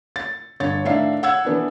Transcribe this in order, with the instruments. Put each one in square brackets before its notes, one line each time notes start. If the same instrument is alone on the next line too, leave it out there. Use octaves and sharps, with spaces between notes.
[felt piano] A6
G1 C#5 A6
A2 D#3 D4 E5 F5 C7
F#5 E6 G#6
E3 B3 D4